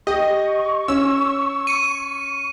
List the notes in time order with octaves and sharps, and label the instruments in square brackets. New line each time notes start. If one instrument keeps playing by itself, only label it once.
[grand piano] G4 [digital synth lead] D#5 [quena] C#6
[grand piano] C#4 [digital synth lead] E6
[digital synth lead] C#7 [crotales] D#7